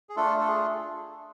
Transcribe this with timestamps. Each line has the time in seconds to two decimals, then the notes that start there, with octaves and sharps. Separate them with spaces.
0.09 G#4
0.16 A3 D4 F4 A4
0.40 A4
0.47 G#4